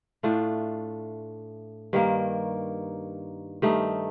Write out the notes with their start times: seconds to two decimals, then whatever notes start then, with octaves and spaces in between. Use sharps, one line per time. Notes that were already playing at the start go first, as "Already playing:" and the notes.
0.23 A2 A3 D4 F4
1.93 G2 D#3 A#3
3.62 G2 D#3 A3 D#4